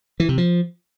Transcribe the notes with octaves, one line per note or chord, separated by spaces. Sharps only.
E3
C3
F3